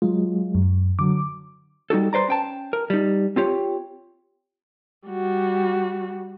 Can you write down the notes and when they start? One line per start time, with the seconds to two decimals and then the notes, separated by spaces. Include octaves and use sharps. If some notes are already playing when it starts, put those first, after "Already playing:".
0.02 F#3 G#3 F4
0.55 F#2
0.99 D3 F#3 D6
1.90 G3 D#4 F#4 A4
2.13 B4 C5 D5 A#5
2.28 C#4 G5 A5
2.73 A#4
2.90 G3 D#4
3.36 C4 F4 G4 C#5
5.08 G3 F#4